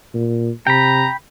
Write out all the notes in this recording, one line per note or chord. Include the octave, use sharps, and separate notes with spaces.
A#2
C3 G5 A#5 B5